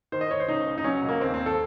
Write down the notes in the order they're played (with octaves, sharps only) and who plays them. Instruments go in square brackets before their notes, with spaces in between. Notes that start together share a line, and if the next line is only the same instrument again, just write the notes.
[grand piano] D#3 C5
D#5
D#3 C#5
C5
C#2 D#4
C#2
D#4
F#3 C#4
C#2
A#3
D#2 C4
C4
D#2
A4